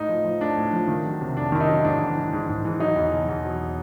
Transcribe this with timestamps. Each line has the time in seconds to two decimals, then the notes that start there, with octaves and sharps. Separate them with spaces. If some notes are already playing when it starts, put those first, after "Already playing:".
Already playing: A2 D#4
0.09 F3
0.24 F3
0.41 A2 D4
0.57 A2
0.73 F3
0.88 D#3
1.04 F#3
1.21 C3
1.36 F2 D4
1.52 D#3 E4
1.60 D#4
1.69 F#3
1.84 G#2 D4
2.01 E3
2.16 E3
2.33 G#2
2.49 G#2
2.65 E3
2.80 F#3 D#4
2.96 E2
3.12 B2
3.28 E2
3.45 F#3